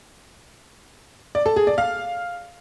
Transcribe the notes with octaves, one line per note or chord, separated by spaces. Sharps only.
D5
A4
G#4
D5
F5